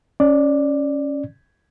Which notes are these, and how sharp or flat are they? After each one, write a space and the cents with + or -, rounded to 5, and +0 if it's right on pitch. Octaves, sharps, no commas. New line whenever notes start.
C#4 +0 D5 +10